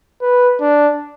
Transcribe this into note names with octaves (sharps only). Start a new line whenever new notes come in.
B4
D4